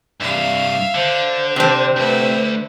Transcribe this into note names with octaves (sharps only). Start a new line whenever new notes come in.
C2 G2 E5 F5
D3 C5
C3 C4 D4
D2 B4 E5